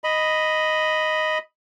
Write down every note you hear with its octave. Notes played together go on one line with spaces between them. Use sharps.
D#5 B5